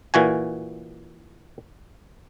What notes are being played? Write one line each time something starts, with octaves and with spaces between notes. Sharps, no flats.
A#2 E3 F#4 G#5